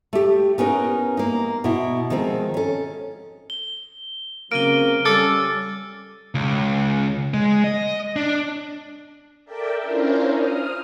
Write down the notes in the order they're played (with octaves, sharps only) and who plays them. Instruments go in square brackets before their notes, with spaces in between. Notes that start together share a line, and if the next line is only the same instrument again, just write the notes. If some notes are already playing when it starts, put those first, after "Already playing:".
[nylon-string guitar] A3 G4
B3 C#4 D#4 A#4
A#3 D#4
B2 E4
D#3 F3 G#3 C4
C#4 A4
[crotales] G7
[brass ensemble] C#3 F#3 C4 [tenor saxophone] A#3 [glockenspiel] F6 D#7 G7 [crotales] D7
[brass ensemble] G3 C#4 [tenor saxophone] A4 [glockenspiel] D6 E6 A6
[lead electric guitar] C#2
G#3
D#5
D4
[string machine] A4 A#4 D5 E5 G5
C#4 D4 E4 F4 A#4 C5
D#6 F6